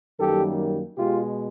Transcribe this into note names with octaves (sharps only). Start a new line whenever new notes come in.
F#2 D#3 G3 A#3 G4 A4
B2 G#3 F4 G4